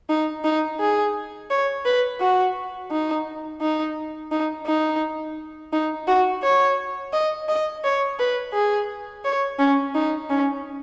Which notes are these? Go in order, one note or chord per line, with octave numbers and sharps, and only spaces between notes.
D#4
D#4
G#4
C#5
B4
F#4
D#4
D#4
D#4
D#4
D#4
F#4
C#5
D#5
D#5
C#5
B4
G#4
C#5
C#4
D#4
C#4